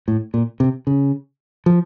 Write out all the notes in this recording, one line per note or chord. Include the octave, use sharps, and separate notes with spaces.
A2
A#2
C3
C#3
F3